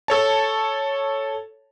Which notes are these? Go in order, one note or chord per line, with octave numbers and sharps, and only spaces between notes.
A4 C#5 A5